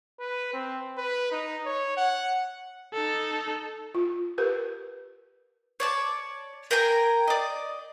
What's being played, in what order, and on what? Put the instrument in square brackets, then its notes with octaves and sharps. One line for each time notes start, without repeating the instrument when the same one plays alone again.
[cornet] B4
C4
B4
D#4
C#5
F#5
[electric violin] D#4 A4
[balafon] F4
G4 A#4 B4
[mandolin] C#5 D5 A5
A#4 G5 G#5 A#5
D5 D#5